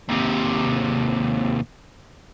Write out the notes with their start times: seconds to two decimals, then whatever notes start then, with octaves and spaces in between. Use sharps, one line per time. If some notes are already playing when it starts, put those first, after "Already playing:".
0.09 D#2 C3